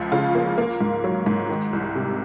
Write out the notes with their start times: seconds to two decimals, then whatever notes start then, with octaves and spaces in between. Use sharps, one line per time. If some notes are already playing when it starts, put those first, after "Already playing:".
Already playing: C#2 F3
0.12 C#3 F4
0.35 A#3
0.58 A#3
0.80 G#2
1.04 F#3
1.26 G#2
1.50 D#3
1.73 C2
1.95 C3